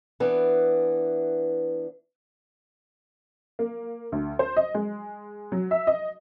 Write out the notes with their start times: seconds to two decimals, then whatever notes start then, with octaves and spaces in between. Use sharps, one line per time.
0.20 E3 B3 D4
3.59 A#3
4.12 D2
4.39 C5
4.57 D#5
4.74 G#3
5.52 F#3
5.71 E5
5.87 D#5